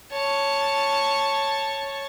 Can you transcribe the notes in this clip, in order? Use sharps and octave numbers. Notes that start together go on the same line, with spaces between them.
C#5 A5